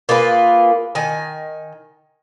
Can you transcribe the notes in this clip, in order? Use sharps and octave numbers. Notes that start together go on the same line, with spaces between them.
A#3 F4 G#4 B4
D#3 G#5